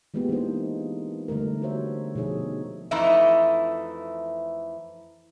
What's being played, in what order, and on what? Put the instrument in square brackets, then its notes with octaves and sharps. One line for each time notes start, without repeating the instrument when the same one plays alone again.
[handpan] E3 G#3 A#3 B3 F4 G4
E3 A#3 B3 D4 D#4 C5
D3 G3 A3 A#4
D4 F#4 G4 C5 C#5 E5
B2 F3 D#4 G#4 C#5 E5
[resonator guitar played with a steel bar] F2 E3 A3 D#4 E4